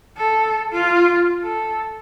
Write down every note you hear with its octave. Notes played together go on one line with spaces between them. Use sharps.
A4
F4
A4